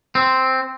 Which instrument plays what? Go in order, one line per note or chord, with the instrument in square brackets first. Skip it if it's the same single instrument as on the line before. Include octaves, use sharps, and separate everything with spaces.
[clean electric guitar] C4